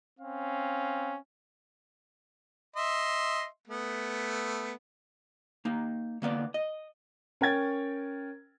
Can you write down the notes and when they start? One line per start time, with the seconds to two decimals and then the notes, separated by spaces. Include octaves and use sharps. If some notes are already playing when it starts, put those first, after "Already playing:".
0.18 C4 C#4 F5
2.76 D#5 E5 C6
3.68 A3 B3
5.65 A#3 D#4
6.22 D3 A#3 B3 D5
6.54 D#5
7.41 C#4 A#4 G5 G#6 A6